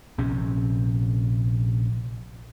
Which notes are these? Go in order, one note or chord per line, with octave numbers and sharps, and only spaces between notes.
A#1 C3 C#4